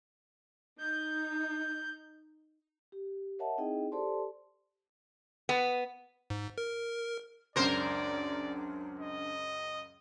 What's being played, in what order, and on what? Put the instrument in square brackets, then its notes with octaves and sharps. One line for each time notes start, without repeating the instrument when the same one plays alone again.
[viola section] D#4 [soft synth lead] G6
[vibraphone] G4
A#4 C#5 D#5 E5 F#5 A5
C4 D#4 E4 G#4 D#5 G5
G4 A4 C5 D5 A5 C6
[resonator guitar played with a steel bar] B3
[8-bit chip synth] G#2
A#4
[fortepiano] C#2 F#2 [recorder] D4 [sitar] A#4 C5 [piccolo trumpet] D5
[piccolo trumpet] D#5